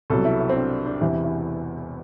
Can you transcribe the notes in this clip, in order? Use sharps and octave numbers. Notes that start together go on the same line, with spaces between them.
C2 B2 F#3 A4
E4
E4
C4
D4
D4
E1 E2 C3 E3 E4
E4